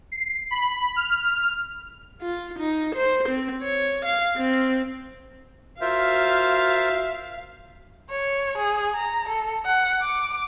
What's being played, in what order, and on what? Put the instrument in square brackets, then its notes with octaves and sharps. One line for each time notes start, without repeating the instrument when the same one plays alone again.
[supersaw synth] C7
B5
F6
[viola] F4
D#4
C5
C4
C#5
F5
C4
[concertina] F4 A#4 C5 [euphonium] F#4 [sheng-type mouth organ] E5 [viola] F5
[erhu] C#5
G#4
A#5
A4
F#5
D6